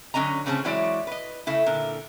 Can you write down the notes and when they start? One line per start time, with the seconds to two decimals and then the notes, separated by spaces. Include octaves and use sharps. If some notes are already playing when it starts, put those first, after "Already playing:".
0.14 F#2 D3 C#4 D#5 A#5
0.46 A2 C#3 C4 C#4 G#4 A5
0.64 E3 F#3 G#3 E4 C#5 D5
1.07 B4 D#5
1.47 C#3 A3 E4
1.66 A#2 D3 A#4